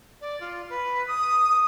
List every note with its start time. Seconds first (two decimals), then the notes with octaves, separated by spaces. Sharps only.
0.21 D5
0.41 F4
0.70 B4
1.07 D#6